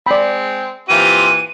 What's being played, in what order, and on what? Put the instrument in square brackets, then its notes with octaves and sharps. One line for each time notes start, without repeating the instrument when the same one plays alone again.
[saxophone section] G#3 C4 [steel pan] D5 B5
[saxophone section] A#2 E3 [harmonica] C4 F4 G4 [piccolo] D#7